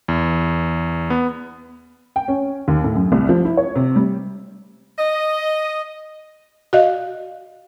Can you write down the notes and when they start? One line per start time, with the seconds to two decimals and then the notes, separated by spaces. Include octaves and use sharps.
0.08 E2
1.10 B3
2.16 G5
2.28 C#4
2.68 D#2
2.84 A2
2.95 F#2
3.12 C2
3.29 F3
3.45 E4
3.57 C#5
3.76 C3
3.96 G3
4.98 D#5
6.73 F#4 D5 D#5 F5